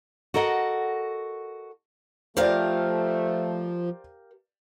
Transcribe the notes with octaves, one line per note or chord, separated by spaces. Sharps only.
F#4 A4 A#4 D#5 E5 F#5
F3 A3 G4 A#4 C5 D5 F5